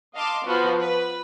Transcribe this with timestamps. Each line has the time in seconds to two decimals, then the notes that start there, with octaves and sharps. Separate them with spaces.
0.15 D#5 F5 A5 C6 D6
0.46 F3 B3 F#4
0.81 B4